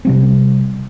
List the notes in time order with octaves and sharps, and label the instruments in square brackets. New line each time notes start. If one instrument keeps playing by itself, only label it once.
[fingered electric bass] C3 G3 C4